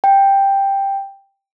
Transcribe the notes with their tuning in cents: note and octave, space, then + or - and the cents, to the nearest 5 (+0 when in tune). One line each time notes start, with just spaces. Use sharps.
G5 +5